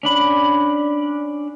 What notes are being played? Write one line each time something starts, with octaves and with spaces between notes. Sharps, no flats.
C#4 D4 B5